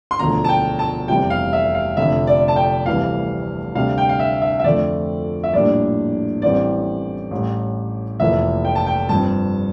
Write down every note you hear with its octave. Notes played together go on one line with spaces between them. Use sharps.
C6
E1 D2 D3 F3 A#5
A5
G5
A5
F1 E2 C3 G3 G5
F5
E5
F5
F1 F2 D3 E5
D5
A5
G5
D2 C3 E3 G3 F5
D2 C3 G3 D4 F5
G5
F5
E5
E5
E5
F2 D3 F3 A3 D5
E5
A#1 A2 G3 A#3 D4 D5
A1 A2 E3 G3 C4 D5
A1 A2 G3
F1 F2 E3 A#3 E5
G5
A5
G5
G2 F3 C4 A5